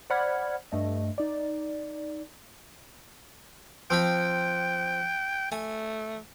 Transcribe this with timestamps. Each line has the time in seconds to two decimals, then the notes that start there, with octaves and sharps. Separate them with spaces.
0.10 C5 D5 F#5 B5 F6 G#6
0.72 G2 A3 D#5
1.18 D#4 D5
3.90 F3 C4 G5 B5
5.52 A3 G#5